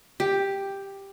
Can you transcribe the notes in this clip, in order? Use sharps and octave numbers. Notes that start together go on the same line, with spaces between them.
G4